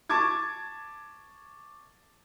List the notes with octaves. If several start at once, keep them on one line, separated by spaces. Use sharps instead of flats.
A5 C#6 D6 G#6 A6